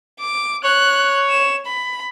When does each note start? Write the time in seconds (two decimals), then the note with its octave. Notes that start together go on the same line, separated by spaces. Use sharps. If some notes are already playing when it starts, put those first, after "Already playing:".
0.20 D6
0.64 C#5 F#6
1.30 E7
1.66 B5